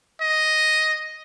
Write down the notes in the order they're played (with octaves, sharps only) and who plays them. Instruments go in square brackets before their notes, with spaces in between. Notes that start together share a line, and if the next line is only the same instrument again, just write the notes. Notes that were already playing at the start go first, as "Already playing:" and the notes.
[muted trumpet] D#5